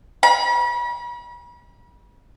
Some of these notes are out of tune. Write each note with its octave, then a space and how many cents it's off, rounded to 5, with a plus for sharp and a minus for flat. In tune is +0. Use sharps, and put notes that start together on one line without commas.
B5 -40